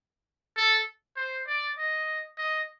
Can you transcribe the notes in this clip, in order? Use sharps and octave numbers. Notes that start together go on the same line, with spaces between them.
A4
C5
D5
D#5
D#5